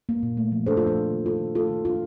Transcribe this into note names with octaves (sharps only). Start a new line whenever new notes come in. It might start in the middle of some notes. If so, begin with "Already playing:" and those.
A#3
A#2
A3
F3
D4 A4 C5
F4 A4
F3
F4
A#3
D#3
D#4 F4 A4
D#3
A3 F4 A4
D#3
D4 F4